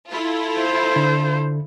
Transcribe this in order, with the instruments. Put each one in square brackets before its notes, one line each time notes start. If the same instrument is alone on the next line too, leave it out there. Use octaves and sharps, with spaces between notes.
[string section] E4 F4 A4
[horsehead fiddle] C5
[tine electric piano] D3